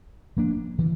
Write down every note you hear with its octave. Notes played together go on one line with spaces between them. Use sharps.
F3 A#3 D4
E3